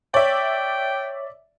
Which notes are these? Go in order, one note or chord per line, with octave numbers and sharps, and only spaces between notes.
C#5 D5 E5 G5